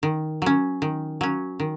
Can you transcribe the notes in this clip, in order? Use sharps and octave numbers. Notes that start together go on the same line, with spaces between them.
D#3
F#3 C#4
D#3
F#3 C#4
D#3